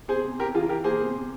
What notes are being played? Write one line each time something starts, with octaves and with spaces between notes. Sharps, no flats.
C3 G#4 C5
C3
C3 G4 A#4
E3 F4 G#4
E3 G4 A#4
A#3 G#4 C5
C3
C3